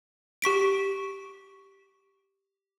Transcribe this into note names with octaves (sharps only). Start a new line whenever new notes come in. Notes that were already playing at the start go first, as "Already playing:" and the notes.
G4 C#6 B6 D7